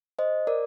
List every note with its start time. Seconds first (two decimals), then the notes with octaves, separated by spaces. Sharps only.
0.19 C5 D#5
0.47 A#4 D5